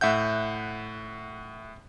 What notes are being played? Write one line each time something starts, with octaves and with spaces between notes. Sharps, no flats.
A2 E5 F#5 G6